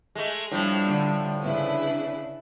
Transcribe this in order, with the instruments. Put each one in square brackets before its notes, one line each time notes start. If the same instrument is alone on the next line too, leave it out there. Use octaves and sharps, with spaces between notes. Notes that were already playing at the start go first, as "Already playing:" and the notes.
[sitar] G#3 A3
[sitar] A2 F3 [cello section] G3 D4
[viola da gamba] D3
[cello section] C#3 D4 [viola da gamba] E4 B4